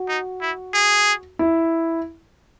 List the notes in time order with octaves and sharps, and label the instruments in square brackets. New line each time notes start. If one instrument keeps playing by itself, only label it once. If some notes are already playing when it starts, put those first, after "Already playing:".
Already playing: [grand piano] F#4
[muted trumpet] D#4
E4
G#4
[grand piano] E4